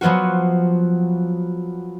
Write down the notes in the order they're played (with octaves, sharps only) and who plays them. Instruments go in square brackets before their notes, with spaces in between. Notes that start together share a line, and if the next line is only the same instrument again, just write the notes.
[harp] F3 F#3 B3 F4 F#4